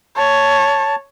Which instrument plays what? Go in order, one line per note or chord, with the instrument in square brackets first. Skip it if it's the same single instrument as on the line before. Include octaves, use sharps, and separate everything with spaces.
[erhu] C#5 [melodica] A5